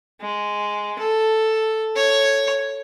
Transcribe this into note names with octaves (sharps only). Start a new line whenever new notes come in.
G#3
A4
C#5